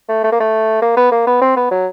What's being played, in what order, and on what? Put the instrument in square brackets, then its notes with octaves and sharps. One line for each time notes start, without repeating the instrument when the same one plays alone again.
[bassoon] A3
A3
A#3
A3
A#3
B3
A#3
B3
C4
B3
F#3